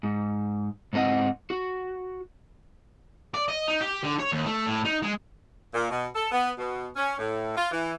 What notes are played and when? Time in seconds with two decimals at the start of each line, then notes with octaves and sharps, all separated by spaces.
0.03 G#2
0.93 G#2 C4 A4 D#5 F#5
1.50 F#4
3.34 D5
3.48 D#5
3.68 D#4
3.81 G4
4.04 D3
4.20 C#5
4.32 D#2
4.45 A3
4.67 A2
4.85 D#4
5.03 G#3
5.74 A#2
5.90 B2
6.14 A4
6.32 B3
6.58 B2
6.96 C#4
7.19 A2
7.56 F4
7.72 E3